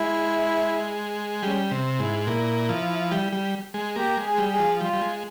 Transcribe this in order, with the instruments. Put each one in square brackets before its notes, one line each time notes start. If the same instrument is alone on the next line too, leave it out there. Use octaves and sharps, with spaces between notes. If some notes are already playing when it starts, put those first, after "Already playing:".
Already playing: [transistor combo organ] G#3 [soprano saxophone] E4
[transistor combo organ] G3 [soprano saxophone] C#4
[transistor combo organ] C3
[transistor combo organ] G#2 [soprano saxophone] E4
[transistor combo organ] A#2 [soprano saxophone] E4
[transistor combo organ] F3
G3
G3
G#3
[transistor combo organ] A#3 [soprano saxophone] G4
[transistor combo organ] G#3
[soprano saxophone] G#4
[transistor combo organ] G3
[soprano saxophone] G#4
[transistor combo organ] F3
[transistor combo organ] G3 [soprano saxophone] F4
[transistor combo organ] G3
G#3